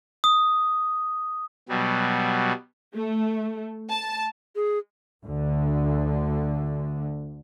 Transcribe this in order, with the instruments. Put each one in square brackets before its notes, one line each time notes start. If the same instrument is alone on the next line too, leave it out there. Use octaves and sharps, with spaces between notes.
[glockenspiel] D#6
[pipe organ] B2 F#3 G3
[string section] A3
A5
[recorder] G#4
[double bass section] D2 D3